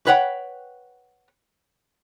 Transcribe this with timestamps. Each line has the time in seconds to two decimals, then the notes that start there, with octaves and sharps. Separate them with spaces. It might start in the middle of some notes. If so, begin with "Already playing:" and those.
0.07 B4 C#5 F#5 G5 A5 B5